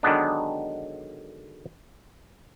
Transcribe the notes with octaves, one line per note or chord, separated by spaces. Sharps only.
D3 D#3 F#3 G#3 B3 D4